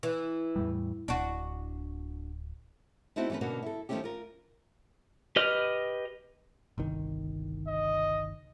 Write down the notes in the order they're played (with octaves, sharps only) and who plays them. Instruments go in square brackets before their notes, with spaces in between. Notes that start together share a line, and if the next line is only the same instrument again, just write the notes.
[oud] E3
[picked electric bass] E2 A2 G3
[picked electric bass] D1 [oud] D4 F#4
[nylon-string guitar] A3 B3 C4 D#4 E4 F#4
E3 G3 A3 C#4 B4
B2 D3 A#3 C#4 F#4
E4 A4
D#3 F3 G#3 A3 C#4 G4
F4 A#4
[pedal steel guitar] G4 B4 D#5 F6
[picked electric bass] G1 C2 D#3
[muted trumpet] D#5